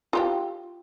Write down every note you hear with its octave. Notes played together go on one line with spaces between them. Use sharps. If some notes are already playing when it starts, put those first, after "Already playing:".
F4 G4 G5